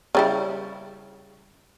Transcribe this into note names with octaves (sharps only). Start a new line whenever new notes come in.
C#3 G3 E4